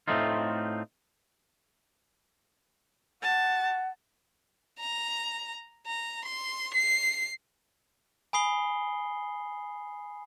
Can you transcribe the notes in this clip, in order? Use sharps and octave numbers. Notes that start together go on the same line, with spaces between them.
A2 A3 C4 D#4 F4
F#5 A5
A#5
A#5
C6
C7
G#5 B5 D#6 C7 G7